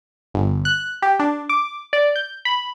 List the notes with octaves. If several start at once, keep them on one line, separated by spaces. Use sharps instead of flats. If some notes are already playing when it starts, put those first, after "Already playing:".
G1
F#6
G4
D4
D6
D5
G6
B5